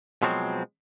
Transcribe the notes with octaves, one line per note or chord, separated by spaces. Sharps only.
B2 F3 F#3 G#3 C4